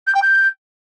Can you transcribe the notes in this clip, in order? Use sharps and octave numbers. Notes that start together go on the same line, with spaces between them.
G6
G5
G6